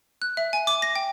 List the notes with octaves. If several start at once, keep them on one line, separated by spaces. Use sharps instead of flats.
F#6
E5
G#5
D6
A#6
G5